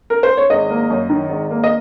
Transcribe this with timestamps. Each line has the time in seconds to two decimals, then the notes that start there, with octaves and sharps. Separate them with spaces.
0.10 A#4
0.23 C5
0.37 C#5
0.50 G#1 D#5
0.70 A#3
0.90 F#2
1.10 D#3
1.30 G#1
1.51 A#3
1.64 D#5